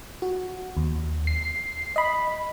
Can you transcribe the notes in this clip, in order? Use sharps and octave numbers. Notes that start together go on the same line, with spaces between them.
F#4
D#2
C7
D#5 B5